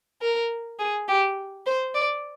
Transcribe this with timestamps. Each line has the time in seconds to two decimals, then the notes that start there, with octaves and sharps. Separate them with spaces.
0.22 A#4
0.79 G#4
1.08 G4
1.66 C5
1.95 D5